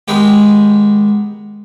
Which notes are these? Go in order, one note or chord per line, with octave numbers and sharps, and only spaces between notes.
D#3 G#3 B3 G4